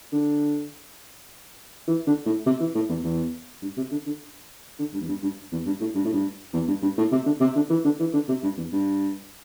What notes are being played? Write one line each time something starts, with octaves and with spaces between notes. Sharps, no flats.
D3
E3
D3
A2
C3
E3
A2
E2
E2
G2
C3
D3
D3
D3
G2
E2
G2
G2
E2
G2
A2
G2
A2
G2
E2
G2
G2
A2
C3
D3
C3
D3
E3
D3
E3
D3
C3
G2
E2
G2